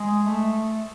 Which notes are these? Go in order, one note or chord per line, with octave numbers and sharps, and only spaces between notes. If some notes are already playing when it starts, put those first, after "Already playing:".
Already playing: G#3
A3